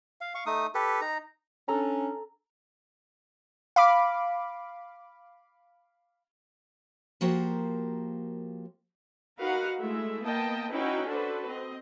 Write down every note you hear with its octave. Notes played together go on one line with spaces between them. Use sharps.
F5
F5 C#6
A3 D#4 D#6
G4 A4 B4
D#4 A#5
C#4 D4 A4 A#5
F5 B5 D6
F3 A#3 F#4 G4 A#4 C5
D#4 F#4 A#4 B4 F5 F#5
G#3 A3 E4 E5
A#3 B3 D#5 G5 A5
C#4 D#4 E4 F#4 B4 G5
D4 F#4 A4 B4 C5
C4 D#5